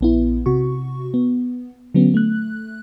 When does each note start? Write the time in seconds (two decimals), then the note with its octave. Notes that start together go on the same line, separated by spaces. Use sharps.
0.01 A#1 B3 E4
0.46 C3 F#4 C#6
1.14 B3
1.94 D3 F#3 B3 C#4
2.14 A3 F#6